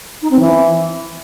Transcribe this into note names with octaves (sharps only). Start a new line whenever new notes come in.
D#4
C4
E3